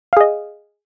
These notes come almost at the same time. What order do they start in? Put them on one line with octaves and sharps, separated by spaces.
F5 G#4 D#5